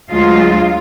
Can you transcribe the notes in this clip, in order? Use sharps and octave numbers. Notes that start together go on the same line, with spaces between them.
D2 F#3 G#3 F4 F5